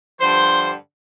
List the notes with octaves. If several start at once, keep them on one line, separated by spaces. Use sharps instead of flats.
G2 D3 F3 C5